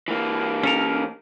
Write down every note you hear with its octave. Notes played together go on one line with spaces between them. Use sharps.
E3 A#3
C#4 A4 A#4